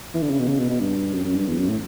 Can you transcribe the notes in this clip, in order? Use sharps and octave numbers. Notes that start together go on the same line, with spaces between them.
E3
D3
C#3
B2
C#3
B2
B2
G2
F#2
F#2
G2
E2
F#2
A2